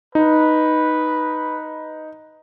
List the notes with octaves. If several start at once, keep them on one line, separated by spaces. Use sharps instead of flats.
D#4 B4